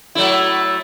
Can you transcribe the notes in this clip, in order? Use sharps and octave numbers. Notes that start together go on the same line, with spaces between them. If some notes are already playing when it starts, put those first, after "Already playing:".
F#3 A3 E4